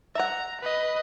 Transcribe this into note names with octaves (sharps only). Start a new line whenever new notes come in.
E5 F#5 A#5
B4 D#5